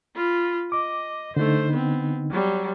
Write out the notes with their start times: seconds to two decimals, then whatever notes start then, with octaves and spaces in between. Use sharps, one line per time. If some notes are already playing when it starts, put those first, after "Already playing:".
0.15 F4 B5
0.72 D#5 D6
1.36 D3 A3 D#4 C5
1.72 B3 C4
2.31 F#3 G3